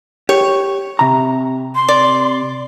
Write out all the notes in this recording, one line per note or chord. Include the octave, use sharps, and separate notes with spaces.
G4 C#5
C3 A#5
C6
D5